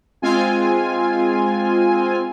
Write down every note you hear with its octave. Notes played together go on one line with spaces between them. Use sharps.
G#3 C4 F4 G#5